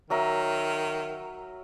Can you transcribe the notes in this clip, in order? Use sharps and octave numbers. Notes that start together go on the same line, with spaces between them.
D#3 F#3 A#4 E5